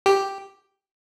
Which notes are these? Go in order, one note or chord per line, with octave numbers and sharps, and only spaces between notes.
G4